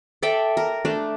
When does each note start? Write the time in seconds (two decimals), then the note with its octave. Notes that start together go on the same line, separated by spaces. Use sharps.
0.23 A4 D5 E5 G5
0.57 A#4
0.85 A3 D4 A4